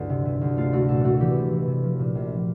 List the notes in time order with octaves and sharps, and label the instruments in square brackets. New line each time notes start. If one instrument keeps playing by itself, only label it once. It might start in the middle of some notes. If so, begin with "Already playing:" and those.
Already playing: [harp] A1 D2 G2 A3
C3
C3
D2
A3 F4
A3 F#4
A#2 A4
A3 F#4
E3 G4
C3
E3
C3
F3
A#2
A#1